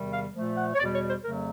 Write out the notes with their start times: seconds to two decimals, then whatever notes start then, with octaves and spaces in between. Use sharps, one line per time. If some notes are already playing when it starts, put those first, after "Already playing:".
Already playing: E2 C3 D#3 G3
0.12 F5
0.34 A#2 F3 A3
0.57 F#5
0.74 C#5
0.78 E2 D5
0.82 B2 G3
0.94 C#5
1.08 C5
1.23 F2 C#3 F#3 A3 A#4